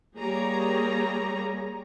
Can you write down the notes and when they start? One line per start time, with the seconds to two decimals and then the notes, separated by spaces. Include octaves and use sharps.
0.16 G3 A#3 G#4 C#5 A#5